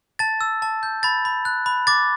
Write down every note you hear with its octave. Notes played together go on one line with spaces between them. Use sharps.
A5 A6
E6
A5
G6
B5 A6
B5
F#6
B5
D6 A6